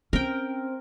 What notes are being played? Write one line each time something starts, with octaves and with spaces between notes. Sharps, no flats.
C4 C#4 A#4 G5